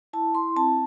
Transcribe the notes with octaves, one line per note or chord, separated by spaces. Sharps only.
E4 A5
E4 C6
C4 A5